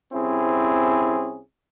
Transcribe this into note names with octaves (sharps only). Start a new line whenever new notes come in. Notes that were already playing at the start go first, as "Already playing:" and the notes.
C2 C4 C#4 E4 G#4